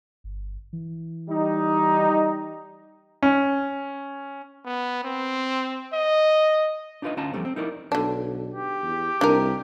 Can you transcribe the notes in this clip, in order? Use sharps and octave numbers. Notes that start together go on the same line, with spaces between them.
G1
E3
G3 D#4
C#4
B3
C4
D#5
D4 D#4 F4 B4 D#5
D2 C#4 F4 A5 A#5
E2 G#2 F3 G3 A3 C4
C4
D#4 E4 A#4 D5
B1 D3 D4
G4
E2
C2 D4 D#4 A#4